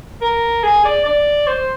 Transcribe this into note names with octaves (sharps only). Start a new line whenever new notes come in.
A#4
G#4
D5
D5
C5